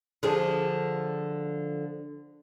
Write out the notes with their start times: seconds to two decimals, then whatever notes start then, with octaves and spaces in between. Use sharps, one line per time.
0.23 D3 F3 G#4